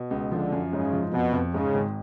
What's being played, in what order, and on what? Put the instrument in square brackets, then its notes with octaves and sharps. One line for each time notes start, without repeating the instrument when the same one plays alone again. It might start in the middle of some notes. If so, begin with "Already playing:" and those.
Already playing: [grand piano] B2
C#2
[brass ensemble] D3 [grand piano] F3
[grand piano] F#2
[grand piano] G#2 [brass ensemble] C#3
[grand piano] F3
[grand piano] F2 [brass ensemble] B2
[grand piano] F2
[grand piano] G#2 [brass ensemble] C#3
[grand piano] G#1